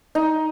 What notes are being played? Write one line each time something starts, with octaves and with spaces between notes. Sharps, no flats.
D#4